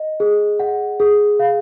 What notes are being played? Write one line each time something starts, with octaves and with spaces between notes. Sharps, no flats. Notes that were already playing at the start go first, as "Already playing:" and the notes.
Already playing: D#5
G#4
F#5
G#4
F5